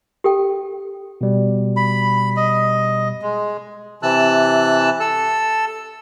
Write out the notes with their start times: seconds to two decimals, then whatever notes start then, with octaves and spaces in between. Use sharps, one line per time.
0.24 G4 A4 G5
1.21 B2 G3
1.77 B5
2.37 D#5
3.22 G#3
4.03 C3 E3 A5 E6 F#6
5.00 A4 E6